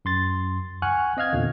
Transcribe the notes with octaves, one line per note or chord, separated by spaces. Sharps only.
F#2 C6 A6
F#5 G#5 C#6 F6 F#6
C4 D#5 F5 F6 G#6
E2 A#2 D3